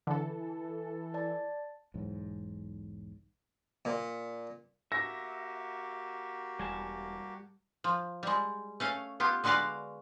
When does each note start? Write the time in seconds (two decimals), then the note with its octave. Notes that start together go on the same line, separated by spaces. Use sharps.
0.07 D3 E3 A4
1.14 D5 A5 A6
1.94 B1 E2 G#2
3.85 A#2
4.92 A#3 F#4 G4 E5 A#6
6.59 E1 G3 G#5 A5
7.84 F3
8.23 G3 G#3
8.80 A3 C#4 F5
9.20 B3 F4 G4
9.44 D3 G#3 F#4 B4 D5 F5